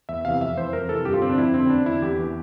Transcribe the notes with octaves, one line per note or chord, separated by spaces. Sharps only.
E2 E5
C3 E3 F5
F2 E5
E3 C5
F2 A#4
C3 E3 A4
G2 G4
F4
D3 C4
D4
F2 E4
D3 C4
E2 D4
D3 E4
E2 G4
E3